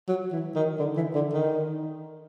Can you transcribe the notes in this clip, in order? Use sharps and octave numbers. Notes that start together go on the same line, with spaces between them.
F#3
E3
D#3
D3
E3
D3
D#3